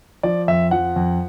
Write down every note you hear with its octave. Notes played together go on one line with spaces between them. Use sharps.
F3 D5
F2 E5
F3 F#5
F2